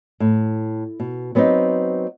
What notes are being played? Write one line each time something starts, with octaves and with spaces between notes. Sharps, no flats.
A2
B2
F#3 B3 C4 D4 D#4